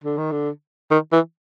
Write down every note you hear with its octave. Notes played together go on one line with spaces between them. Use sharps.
D3
D#3
D3
D#3
E3